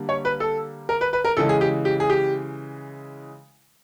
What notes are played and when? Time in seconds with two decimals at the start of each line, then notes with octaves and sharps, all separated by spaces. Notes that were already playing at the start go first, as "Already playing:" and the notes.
Already playing: D3 G3 A#3
0.09 C#5
0.25 B4
0.40 A4
0.89 A#4
1.01 B4
1.13 B4
1.25 A#4
1.37 C#3 E3 G#3 A4
1.49 G#4
1.61 G4
1.85 G4
2.00 G#4
2.10 G4